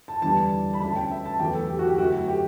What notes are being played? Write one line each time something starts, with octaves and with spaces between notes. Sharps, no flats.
A5
E2 D3 G3 D4 A5
B5
D2 D3 A3 C#4 A5
G5
E5
A5
E2 D3 F#3 A3 G5
A4
G4
F#4
G4
F#2 D3 A3 F#4
G4